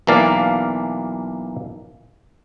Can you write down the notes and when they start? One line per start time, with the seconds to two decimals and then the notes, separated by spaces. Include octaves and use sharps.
0.07 B1 E3 A#3 D5 F5